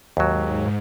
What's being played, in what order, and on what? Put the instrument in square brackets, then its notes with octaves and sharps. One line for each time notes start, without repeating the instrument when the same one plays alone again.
[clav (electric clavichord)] D#2 F#3 [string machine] G#2